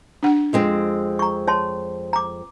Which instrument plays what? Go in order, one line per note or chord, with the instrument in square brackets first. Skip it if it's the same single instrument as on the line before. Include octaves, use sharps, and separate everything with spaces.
[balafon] D4 F#5
[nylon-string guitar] F2 G#3 C4
[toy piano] A#5 C#6
C#5 A5 C6
A#5 D6